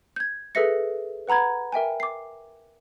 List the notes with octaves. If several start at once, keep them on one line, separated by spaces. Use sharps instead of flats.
G6 G#6
G#4 A4 B4 E5 A#6 C#7
B4 F#5 A#5 B5 G#6
A#4 E5 G5 G#5
D6 C7